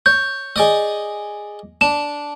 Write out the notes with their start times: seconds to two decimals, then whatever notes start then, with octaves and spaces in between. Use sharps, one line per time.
0.06 C#5 G6
0.56 G#4 D5 D#5
1.81 D4 E7